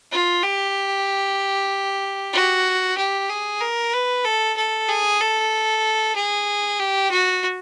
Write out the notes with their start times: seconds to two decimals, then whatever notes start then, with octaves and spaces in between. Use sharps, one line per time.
0.12 F4
0.43 G4
2.33 F#4
2.98 G4
3.30 G#4
3.61 A#4
3.93 B4
4.24 A4
4.57 A4
4.88 G#4
5.20 A4
6.16 G#4
6.79 G4
7.11 F#4